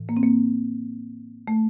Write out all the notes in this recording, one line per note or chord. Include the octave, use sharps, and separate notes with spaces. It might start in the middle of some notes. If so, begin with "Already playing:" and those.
Already playing: A2 E3
A#3
C4
A#3
A3